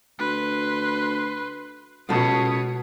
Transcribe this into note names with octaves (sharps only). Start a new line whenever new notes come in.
D2 B4 C6
C#2 B2 B3 A4 C#5 D#6